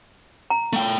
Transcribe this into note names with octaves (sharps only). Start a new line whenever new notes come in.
A#5
A3 G5